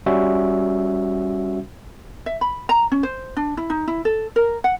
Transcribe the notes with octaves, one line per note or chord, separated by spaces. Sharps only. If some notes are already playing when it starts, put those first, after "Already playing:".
G3 C#4 F#4 E5
E5
B5
A#5
C#4
C5
D4
E4
D#4
E4
A4
A#4
F#5